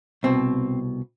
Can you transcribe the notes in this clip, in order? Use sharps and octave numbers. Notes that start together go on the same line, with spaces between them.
C2 B2 C4